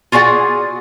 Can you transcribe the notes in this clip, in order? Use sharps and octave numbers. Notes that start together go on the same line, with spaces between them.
F4 F#4 G#4 D5 F#5